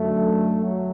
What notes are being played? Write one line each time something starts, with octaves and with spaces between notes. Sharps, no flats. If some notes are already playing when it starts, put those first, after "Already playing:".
Already playing: F#2 D3 F#3 A3
F#3